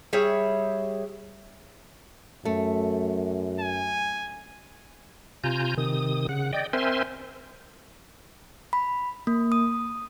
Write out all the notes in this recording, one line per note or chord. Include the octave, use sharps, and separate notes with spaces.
G3 G#4 C#5 E5
F#2 A3
G#5
C3 F4 G#5 A#5 G6
C3 D#3 D#6
C#3 F#5
D5 D#5 G5
C4 A#4 C5 E5 G#5 C6
B5
A#3
D#6